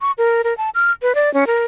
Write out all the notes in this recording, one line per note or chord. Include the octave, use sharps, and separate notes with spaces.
C#6
A#4
A#4
A5
F6
B4
D5
C#4
A#4